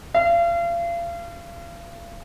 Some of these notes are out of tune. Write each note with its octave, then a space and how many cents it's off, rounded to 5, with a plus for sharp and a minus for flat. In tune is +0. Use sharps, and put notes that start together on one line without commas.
F5 -35